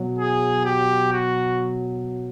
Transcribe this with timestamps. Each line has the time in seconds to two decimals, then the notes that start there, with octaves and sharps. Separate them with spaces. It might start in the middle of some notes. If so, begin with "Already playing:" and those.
Already playing: B2 F#3
0.17 G#4
0.65 G4
1.11 F#4